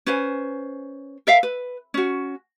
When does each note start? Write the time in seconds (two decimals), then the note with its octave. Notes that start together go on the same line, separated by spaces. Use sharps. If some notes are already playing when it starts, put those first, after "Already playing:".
0.06 C#4 B4 C5 G#5
1.27 A#4 E5 F5
1.43 B4
1.94 C#4 F#4